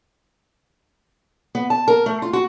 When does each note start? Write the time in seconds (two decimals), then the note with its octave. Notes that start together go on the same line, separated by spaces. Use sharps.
1.55 B3
1.70 A5
1.88 A#4
2.06 A3
2.22 F4
2.33 F#4